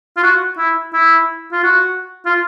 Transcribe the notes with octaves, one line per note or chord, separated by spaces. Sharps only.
F4
F#4
E4
E4
F4
F#4
F4